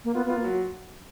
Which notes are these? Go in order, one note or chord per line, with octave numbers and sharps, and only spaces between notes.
A#3
B3 F4
B3
F4
A#3
F#3